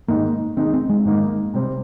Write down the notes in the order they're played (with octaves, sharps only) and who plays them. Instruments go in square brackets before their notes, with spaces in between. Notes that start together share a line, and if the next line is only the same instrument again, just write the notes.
[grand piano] G#2 D#3 G#3 D#4 [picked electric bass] A#3
[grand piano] D#3 G#3 D#4 [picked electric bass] C4
[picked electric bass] C4
G#3
[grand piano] G#2 D#3 A#3 D#4
C3 G3 C4